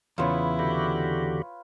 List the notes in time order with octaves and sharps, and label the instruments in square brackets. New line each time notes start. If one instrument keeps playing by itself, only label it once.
[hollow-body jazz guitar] E2 C#3 [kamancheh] E4 [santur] F4 B4 C#5
[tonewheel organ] D3 F#4 G4